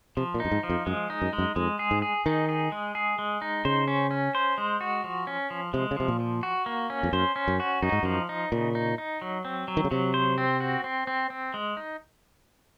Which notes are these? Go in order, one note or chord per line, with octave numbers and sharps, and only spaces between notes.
C3 F3
A#2
F#2 D#4
G#2
F3
F2
F#2 G#3
D#4
F#2
G#3
F#2
F2 G#3
G#4
G#2
G#4
D#3 D#4
G#4
G#3
G#4
G#3
D#4
C#3 C5
C#4
C#4
C5
G#3
F#4
F3
C#4
F3
C3 G#3
C#3
C3 F3
A#2
F3
F#4
A#3
C#4
F2
F#2 C5
C#4
F#2
F#4
F#2 D#4
G#2
F#2 F3
D#4
A#2 C#3
D#4
D#4
F#3
C4
F#3
D#3
C#3
C3 F#3
C5
C4
F#4
C4
C4
C4
G#3
D#4